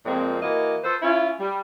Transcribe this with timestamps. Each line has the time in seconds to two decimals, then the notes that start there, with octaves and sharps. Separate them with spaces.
0.06 F2 A#2 G#3 C4
0.42 E3 A#3 F#4 D#5
0.84 F4 A4 B4 C5
1.02 C#4 E4 F4
1.40 G3